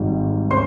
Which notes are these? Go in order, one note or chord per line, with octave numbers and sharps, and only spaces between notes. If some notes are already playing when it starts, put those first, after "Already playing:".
Already playing: G#1 G#2 D#3 G3
C#4 C5 C6